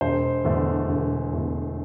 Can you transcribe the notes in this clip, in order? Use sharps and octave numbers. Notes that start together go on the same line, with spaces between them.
E1 C5
E2 D3 A3
E1
E2 D3 A3